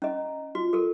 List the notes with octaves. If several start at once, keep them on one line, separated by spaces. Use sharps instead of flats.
C#4 D#5 A#5
F4 F#4
A4 A#4